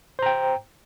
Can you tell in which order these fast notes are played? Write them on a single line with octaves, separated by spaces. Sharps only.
C5 A#5 G5